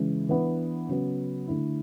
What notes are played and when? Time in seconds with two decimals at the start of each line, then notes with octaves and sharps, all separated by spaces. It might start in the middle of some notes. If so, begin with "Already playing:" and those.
Already playing: C#3 E3 G#3
0.29 E3 B3 D4
0.89 C#3 F#3 B3
1.47 D3 A3 E4